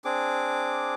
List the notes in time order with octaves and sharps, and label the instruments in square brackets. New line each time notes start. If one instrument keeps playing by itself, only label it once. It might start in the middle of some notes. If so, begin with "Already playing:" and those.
[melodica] C4 D4 G#4 D6